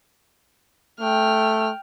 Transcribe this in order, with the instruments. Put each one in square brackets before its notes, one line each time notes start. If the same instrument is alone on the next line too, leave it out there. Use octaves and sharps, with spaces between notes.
[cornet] A3 [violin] G5 F6